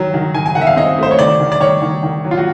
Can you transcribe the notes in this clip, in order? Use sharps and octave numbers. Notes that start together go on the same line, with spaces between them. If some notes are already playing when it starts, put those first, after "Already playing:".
Already playing: D#3 F#3
D#3
D#3 G#5
G#5
D#3 F#5
E5
F5
C4 D#5
A3 C5
C#5
D#3 D5
D#3
D5
D#3 C#5
D#3
D#3
F#3
F4
F#4